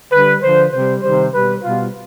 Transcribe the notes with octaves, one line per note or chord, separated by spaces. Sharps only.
D3 G3 B4
D3 F3 C5
C3 G3 C5
C3 D#3 G3 C5
B2 G3 B4
B2 G3 F4